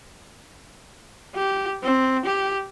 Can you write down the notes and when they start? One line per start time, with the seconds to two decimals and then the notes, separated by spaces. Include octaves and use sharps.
1.35 G4
1.83 C4
2.25 G4